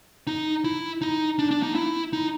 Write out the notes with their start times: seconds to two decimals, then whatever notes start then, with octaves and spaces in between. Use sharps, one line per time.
0.27 D#4
0.64 E4
1.01 D#4
1.39 D4
1.51 D4
1.63 D#4
1.75 E4
2.13 D#4